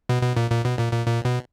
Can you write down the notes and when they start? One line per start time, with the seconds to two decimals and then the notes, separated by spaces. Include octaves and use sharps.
0.09 B2
0.23 B2
0.37 A#2
0.51 A#2
0.65 B2
0.79 A#2
0.92 A#2
1.07 A#2
1.25 B2